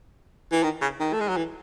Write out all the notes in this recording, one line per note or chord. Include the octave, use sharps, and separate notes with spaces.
E3
D#3
C#3
D#3
A3
G#3
F#3
E3